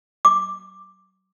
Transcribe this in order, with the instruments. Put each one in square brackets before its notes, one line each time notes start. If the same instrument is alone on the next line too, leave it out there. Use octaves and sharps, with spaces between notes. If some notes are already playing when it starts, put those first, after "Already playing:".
[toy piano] D6